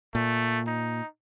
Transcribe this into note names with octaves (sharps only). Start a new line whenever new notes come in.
A#2 A3
D#4